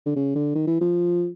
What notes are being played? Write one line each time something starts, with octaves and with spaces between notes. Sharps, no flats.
D3
C#3
D3
D#3
E3
F3